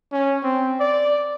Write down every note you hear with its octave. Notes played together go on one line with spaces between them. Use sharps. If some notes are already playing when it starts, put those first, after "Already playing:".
C#4
C4
D5